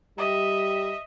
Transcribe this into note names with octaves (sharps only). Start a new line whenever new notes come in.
G3 G4 D#5 E5